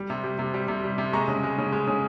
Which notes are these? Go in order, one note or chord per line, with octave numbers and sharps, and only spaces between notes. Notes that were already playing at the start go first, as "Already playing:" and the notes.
Already playing: G3
C3
G3
C3
G3
C3
G3
C3
G#3 A#5 C#6
C#3
G#3
C#3
G#3
C#3